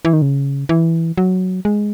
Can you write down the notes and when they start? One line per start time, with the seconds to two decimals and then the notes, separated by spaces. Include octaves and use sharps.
0.05 E3
0.13 D#3
0.22 C#3
0.69 E3
1.18 F#3
1.65 G#3